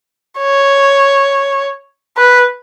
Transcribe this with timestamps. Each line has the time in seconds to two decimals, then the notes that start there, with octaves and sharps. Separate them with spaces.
0.39 C#5
2.17 B4